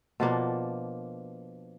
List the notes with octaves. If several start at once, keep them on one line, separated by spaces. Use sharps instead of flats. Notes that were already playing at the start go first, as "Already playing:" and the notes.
B2 F3 A#3 D4